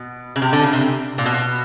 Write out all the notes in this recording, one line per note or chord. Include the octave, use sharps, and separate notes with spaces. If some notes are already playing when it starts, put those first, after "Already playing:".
Already playing: B2
C#3
C3
D3
C#3
C3
A#2
B2